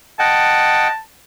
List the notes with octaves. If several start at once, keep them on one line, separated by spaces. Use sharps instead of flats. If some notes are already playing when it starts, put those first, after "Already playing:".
D#5 F#5 G5 A5